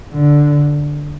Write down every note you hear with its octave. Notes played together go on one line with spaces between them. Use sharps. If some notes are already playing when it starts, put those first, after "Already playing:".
D3